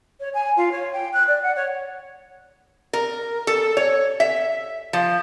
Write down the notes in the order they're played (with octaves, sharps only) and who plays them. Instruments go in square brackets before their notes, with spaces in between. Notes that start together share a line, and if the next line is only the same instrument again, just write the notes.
[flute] C#5
G#5
F4
C#5
G5
F#6
D5
F#5
C#5
[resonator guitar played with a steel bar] A#4
A4
C#5
E5
F3